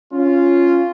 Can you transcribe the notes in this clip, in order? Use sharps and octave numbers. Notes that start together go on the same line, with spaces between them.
C#4 F4